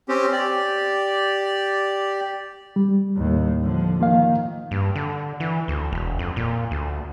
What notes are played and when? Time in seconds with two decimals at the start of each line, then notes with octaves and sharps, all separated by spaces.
0.09 C4 C#4 G4
0.32 G4 D5
2.76 G3
3.17 D#2 A2
3.62 D3 F3
4.00 D#3 F3 A#3 F5
4.71 G2
4.95 D3
5.40 E3
5.68 D2
5.92 E1
6.19 F2
6.36 A#2
6.71 D2